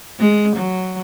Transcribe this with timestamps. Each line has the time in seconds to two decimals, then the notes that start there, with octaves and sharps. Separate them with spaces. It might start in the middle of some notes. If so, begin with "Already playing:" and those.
0.20 G#3
0.57 F#3